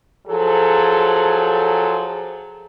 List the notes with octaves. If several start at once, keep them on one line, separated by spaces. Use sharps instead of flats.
F3 F#3 G#4 A4